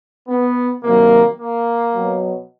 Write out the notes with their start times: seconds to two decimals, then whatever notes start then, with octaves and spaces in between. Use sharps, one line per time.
0.28 B3
0.83 C3 D#3 F#3 A#3
1.38 A#3
1.93 B2 F#3